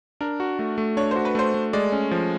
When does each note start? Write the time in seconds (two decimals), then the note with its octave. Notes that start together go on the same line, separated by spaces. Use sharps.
0.21 D4 A#4
0.40 F#4
0.59 A3
0.78 A3
0.97 D4 C#5
1.11 F#4 C5
1.25 B4
1.35 A3 C5
1.54 A3
1.73 G#3 D5
1.92 C#4
2.11 F3